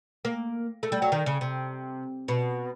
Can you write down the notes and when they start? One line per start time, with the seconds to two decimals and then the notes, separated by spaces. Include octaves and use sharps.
0.25 A#3
0.83 A3
0.92 G3
1.02 F#3
1.12 D#3
1.26 C#3
1.41 C3
2.28 B2